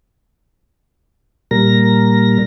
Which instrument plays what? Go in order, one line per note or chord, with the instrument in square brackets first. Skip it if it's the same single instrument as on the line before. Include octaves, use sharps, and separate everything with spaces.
[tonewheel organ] A#2 G3 A#4 A#6